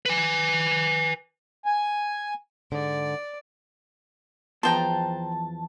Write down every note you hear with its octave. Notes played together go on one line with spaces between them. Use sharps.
B4 G#5
G#5
G#2 D3 D5
E2 F3 B3 C5 G5 A5 A#5